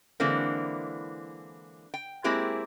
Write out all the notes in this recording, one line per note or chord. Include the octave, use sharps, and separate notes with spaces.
D3 E3 G#3 A#3 C4 E4
G5
G#3 A#3 C4 E4 G4 G#4